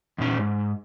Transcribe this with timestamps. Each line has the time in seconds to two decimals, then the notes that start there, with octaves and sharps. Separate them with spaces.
0.18 E2 A#2 C#4
0.38 G#2